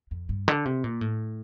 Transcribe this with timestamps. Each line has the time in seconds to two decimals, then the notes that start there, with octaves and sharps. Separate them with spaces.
0.11 F2
0.29 G2
0.48 D3
0.65 C3
0.84 A#2
1.01 A2